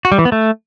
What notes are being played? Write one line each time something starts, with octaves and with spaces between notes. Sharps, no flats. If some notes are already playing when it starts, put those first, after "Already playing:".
F#4
G3
E3
B3
A3